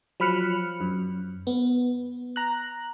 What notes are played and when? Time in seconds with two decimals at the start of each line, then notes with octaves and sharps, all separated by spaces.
0.20 F3 F#3 B5 F6 F#6 C#7
0.81 F#2
1.47 B3
2.36 A#5 F#6